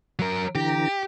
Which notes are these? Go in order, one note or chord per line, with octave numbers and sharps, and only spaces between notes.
F#3 A#4
D3 E3 G4 A#5